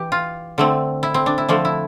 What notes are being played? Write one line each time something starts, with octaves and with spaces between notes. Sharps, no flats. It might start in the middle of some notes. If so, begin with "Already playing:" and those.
Already playing: E3 G4
F4
D3 A3 C4
E4
C4
D4
E4
D3 F3 A3 D4
E4